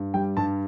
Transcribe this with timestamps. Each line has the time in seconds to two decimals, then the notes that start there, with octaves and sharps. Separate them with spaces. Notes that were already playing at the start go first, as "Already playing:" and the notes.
Already playing: G2
0.14 G3 G5
0.37 G2 A5